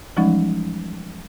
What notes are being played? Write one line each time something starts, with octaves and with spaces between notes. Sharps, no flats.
E3 F3 G3 G#3 C#4 D#4